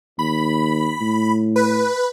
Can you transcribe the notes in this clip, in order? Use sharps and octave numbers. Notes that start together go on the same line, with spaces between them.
D#2 B5
A2
B4